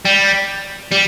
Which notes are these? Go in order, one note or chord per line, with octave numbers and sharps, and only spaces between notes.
G3
G3